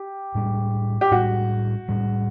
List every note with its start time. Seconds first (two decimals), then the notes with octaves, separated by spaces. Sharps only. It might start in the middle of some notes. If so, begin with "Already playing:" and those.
Already playing: G4
0.35 A2 G3 D4
1.01 G4
1.11 A2 G3 D4 F#4
1.89 A2 G3 D4